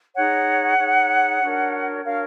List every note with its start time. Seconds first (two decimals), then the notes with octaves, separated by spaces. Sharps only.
0.15 D#4 G#4 C#5 F#5
0.78 D#4 G#4 C#5
1.41 D4 F#4 A#4 C#5
2.04 D4 F#4 A#4 C#5 F5